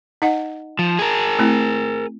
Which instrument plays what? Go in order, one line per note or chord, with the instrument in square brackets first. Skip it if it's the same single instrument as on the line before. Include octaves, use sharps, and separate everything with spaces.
[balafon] D#4 D#5 F#5
[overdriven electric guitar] F3
G#4 A#4
[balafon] A3 C4 E4